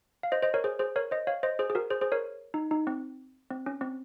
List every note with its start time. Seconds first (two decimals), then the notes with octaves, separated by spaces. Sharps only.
0.23 F5
0.32 C5 D#5
0.43 C5 D#5
0.54 A#4 C#5
0.64 G#4 C5
0.79 G#4 C5
0.96 A#4 C#5
1.11 C5 D#5
1.27 C#5 F5
1.43 C5 D#5
1.59 G#4 C5
1.70 G#4
1.75 F#4 A#4
1.90 G#4 C5
2.01 G#4 C5
2.12 A#4 C#5
2.54 D#4
2.71 D#4
2.87 C4
3.51 C4
3.66 C#4
3.81 C4